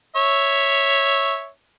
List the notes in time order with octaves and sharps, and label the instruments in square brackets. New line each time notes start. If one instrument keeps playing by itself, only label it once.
[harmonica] C#5 E5